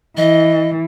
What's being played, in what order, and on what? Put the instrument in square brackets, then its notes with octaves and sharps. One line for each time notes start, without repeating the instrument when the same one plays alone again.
[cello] E3 [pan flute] D#5